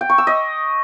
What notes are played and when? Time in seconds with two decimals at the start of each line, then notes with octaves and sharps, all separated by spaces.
0.01 G5
0.10 C#6
0.18 E6
0.27 D#5